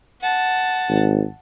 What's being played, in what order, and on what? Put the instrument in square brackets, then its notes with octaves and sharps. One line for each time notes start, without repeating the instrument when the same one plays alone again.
[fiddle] F#5 A5
[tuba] G#1